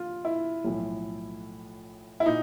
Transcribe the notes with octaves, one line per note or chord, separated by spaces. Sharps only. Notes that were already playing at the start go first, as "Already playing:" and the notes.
Already playing: F3 F4
E4
B1 A2 F3
E4
A#2 D#4